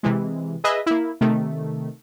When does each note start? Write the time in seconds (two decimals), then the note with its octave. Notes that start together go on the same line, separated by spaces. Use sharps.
0.03 C3 E3 G#3
0.64 G#4 B4 D#5 E5
0.86 A#3 E4
1.21 C3 D#3 A3